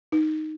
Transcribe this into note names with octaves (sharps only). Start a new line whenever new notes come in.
D#4